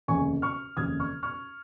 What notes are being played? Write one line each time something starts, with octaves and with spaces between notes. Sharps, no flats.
F1 D#2 C#3 G#5 C#6
C#6 F6
F1 D#2 C#3 D#6 G#6
C#6 F6
C#6 F6